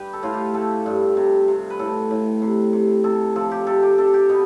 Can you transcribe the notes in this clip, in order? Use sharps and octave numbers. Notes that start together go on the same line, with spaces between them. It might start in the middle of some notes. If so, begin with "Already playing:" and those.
Already playing: G2 G4 B4
A4
A2 F4
G4
A3 A4
G2
C3
C3
B4
A2 A4
A2
C3
C3
C3 A4
F3 A4
G4
C3 A4
G4
C3 A4
G4
B2 B3